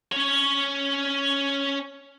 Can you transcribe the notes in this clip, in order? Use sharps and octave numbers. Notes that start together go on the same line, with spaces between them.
C#4 C#5